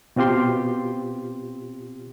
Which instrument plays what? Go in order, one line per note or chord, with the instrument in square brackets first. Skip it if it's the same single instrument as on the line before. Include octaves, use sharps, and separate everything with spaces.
[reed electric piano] B2 C4 F4 G4 C6